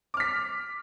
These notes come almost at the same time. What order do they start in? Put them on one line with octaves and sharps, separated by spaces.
D6 F6 B6